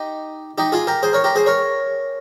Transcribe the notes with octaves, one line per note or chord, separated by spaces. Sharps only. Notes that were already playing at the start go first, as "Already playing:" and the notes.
Already playing: D#4 G4
D#4 G4
F4 G#4
G4 A#4
G#4 C5
A#4 C#5
G4 A#4
G#4 C5
A#4 C#5